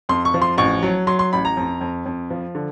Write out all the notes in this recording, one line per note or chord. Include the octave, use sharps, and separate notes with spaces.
F2 C6
C#6
F3
C6
A1 C#6
F#3
F#3 C6
C6
A1 B5
A#5
F2
F2
F2
F3
D3